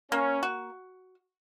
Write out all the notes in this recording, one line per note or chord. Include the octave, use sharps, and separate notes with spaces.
A#3 C#4
F#4